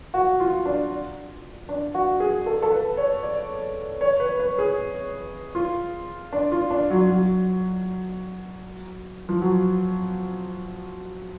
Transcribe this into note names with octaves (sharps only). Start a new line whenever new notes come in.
F#4
F4
D4
D4
F#4
G#4
A4
A4
B4
C#5
D5
C#5
B4
B4
G#4
F4
D4
F4
D4
F#3
F#3
F3
F#3